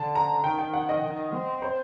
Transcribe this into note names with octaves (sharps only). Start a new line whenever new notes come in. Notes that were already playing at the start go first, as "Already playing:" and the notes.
Already playing: D3 A5
A#5
D#3 G5
G5
F#5
D#5
D#3
C4
C5